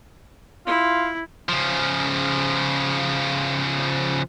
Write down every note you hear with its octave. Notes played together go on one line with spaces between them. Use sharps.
E4 F4
C#3 F3